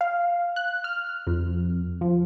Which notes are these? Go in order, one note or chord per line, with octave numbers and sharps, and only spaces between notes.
F5
F#6
F6
F2
F3